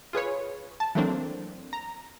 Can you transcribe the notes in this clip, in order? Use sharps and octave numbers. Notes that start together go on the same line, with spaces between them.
F4 G#4 B4 C#5
A5
E3 F#3 A3 A#3 C4 D4
A#5